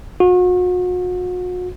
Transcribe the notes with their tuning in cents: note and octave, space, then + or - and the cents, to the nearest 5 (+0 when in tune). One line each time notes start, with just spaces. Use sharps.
F#4 -40